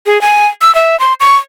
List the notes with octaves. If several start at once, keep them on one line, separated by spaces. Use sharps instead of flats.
G#4
G#5
E6
E5
C6
C#6